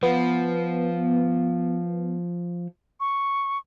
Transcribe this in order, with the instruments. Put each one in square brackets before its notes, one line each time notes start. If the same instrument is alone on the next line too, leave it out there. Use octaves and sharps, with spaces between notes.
[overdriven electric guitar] F3 [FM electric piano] B3
[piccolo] C#6